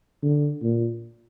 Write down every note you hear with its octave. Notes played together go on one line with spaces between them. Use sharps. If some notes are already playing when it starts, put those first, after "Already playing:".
D3
A#2